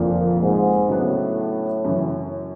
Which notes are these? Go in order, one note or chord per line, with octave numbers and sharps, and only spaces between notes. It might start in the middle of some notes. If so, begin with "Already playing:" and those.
Already playing: F1 F2 A#2 D3 F3 A#3
G#2
A2 C#3 F#3 B3 D4
F#2 C#3 E3